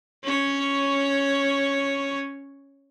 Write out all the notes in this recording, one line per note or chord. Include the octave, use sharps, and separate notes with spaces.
C#4 C#5